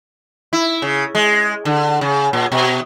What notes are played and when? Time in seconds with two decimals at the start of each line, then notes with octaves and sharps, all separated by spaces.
0.53 E4
0.82 C#3
1.15 G#3
1.65 D3
2.01 C#3
2.33 A#2
2.52 B2